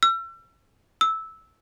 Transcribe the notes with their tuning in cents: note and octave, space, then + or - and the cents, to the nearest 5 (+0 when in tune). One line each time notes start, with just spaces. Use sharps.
E6 +40
E6 -10